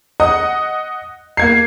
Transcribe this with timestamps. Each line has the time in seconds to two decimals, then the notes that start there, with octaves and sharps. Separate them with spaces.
0.20 D#5 F#5 D#6
1.37 A#3 G#6 C7